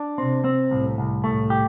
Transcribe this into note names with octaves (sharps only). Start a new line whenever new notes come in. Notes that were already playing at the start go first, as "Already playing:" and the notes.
Already playing: D4
C3 C4
C4
C2 A2
C2
A2 A3
G4